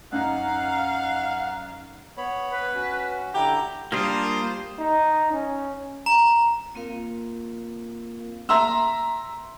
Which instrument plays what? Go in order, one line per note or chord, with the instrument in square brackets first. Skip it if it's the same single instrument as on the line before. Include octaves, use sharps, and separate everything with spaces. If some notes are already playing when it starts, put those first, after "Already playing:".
[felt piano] F#2 D#4 [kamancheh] F5 [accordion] F#5 F#6
[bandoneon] B3 C#5 B5
[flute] B4
[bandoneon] C#4 F#4
[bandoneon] D3 E4 G6 [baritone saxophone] G4 [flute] A#5
[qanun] G3 [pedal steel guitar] A#3 D4 F4 [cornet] C5 [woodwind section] D#6
[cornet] D#4
C#4
[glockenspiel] A#5
[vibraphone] A#3 C4 F4 A#4 F5
[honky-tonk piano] E5 A#5 C6 E6